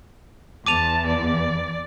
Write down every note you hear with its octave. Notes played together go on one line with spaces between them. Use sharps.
E2 E3 A5 D6 D#7 F7
D5